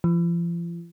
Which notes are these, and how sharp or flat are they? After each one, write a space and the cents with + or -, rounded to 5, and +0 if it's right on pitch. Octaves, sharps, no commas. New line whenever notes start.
F3 -40